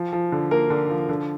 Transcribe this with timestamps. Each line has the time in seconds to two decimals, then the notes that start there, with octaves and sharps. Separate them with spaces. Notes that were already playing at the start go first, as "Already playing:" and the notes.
Already playing: F3
0.13 F3
0.32 D3
0.51 A#3 A#4
0.70 D3
0.90 F3
1.09 D3